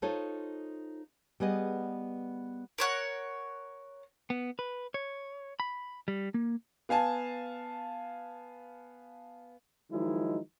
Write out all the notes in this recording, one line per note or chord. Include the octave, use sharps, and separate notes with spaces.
D#4 F4 A4 C5 C#5
G3 B3 G#4 D#5
A#4 C#5 F#5
B3
B4
C#5
B5
G3
A#3
B3 F5 G#5 A5
D#3 F3 F#3 G#3 D#4 E4